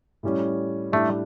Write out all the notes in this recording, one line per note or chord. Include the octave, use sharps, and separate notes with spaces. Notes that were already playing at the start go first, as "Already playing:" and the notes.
A2 G3 C#4
A2 G3 A3 D4